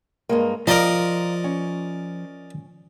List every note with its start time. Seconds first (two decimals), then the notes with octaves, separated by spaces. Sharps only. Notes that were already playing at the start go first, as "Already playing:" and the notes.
0.29 G2 G#3 A#3
0.67 F3 A#4 D5 D#5 F5 A#5
1.44 C#4